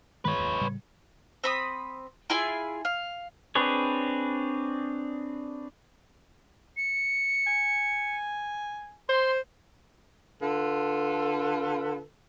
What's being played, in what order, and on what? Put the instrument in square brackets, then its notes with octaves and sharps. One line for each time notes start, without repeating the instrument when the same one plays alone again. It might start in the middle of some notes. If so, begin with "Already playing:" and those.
[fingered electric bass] G2 D#3 G#3 [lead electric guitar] B4 C#5
[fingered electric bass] F1 D#2 G#2
A2 C#3 G3
[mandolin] C4 B5 D#6
E4 F4 G#4 G#5
F5
[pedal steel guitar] C4 D4 G#4 B4 C#5
[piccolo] C#7
[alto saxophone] G#5
[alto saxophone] C5 [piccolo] C6
[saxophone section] D3 F4 A4 B4